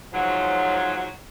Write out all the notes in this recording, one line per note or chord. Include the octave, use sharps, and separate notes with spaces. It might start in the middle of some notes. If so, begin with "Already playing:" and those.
G#2 F3 F#3